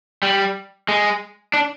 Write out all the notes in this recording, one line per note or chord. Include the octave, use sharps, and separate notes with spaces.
G3
G#3
D4